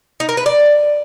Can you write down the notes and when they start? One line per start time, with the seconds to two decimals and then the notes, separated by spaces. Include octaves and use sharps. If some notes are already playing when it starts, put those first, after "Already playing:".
0.20 D#4
0.29 A#4
0.37 B4
0.46 D5